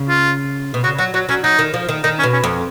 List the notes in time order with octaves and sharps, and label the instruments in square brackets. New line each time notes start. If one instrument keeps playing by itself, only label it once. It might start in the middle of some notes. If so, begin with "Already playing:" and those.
Already playing: [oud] C#3
[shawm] F4
[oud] B2
[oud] C#3 [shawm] F#4
[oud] F#3 [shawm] F#4
[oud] F#3 [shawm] F#4
[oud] F#3 [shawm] C#4
[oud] F#3 [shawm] D#4
[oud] D#3
F3
D#3
[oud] D#3 [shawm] D#4
[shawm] C#4
[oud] B2
[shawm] C#4
[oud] F2